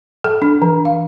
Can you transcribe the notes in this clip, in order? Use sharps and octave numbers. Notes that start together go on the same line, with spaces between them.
A4
D4
E3
F5